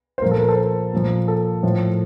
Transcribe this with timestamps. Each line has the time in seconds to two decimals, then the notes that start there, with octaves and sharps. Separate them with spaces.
0.18 C5
0.22 A#2 F3 A#4
0.31 A4
0.40 A#4
0.48 A4 C5
0.58 A#4
0.93 A#2 F3
1.28 A4
1.63 A2 F3